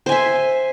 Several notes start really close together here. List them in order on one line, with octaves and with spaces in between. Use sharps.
C5 G#5 E5